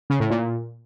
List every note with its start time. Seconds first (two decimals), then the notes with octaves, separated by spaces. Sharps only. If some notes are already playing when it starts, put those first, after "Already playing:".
0.10 C#3
0.20 A2
0.30 A#2